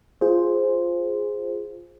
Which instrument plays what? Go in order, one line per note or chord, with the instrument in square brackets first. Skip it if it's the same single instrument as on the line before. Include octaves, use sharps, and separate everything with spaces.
[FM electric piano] F4 G#4 C5